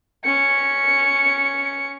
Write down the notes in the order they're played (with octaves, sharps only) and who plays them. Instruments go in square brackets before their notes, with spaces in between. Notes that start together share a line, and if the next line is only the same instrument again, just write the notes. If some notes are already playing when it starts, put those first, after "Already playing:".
[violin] C#4 C#7